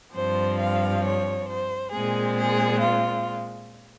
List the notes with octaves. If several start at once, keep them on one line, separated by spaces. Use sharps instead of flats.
G2 F3 C4 C5
F5
C#5
C5
A#2 G#3 C4 G#4
G#4
F4